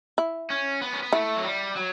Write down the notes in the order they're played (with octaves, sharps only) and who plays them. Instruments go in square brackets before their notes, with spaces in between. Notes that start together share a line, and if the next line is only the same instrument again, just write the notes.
[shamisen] E4
[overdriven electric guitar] C#4
B3
C#4
B3
[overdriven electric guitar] A3 [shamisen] E4
[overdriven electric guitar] F#3
G3
F#3